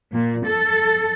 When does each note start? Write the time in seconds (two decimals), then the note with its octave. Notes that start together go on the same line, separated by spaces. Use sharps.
0.13 A#2
0.46 A4